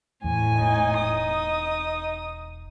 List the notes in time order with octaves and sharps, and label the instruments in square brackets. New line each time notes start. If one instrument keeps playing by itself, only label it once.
[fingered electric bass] E2 [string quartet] A2 G#5
[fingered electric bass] E1 [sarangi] D#4
[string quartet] D#6